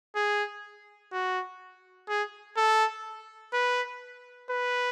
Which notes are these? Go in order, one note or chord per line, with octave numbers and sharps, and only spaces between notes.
G#4
F#4
G#4
A4
B4
B4